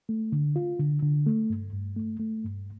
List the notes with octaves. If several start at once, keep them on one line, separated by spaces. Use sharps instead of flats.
A3
D3
F4
D3
D3
A3
G2
G2
A3
A3
G2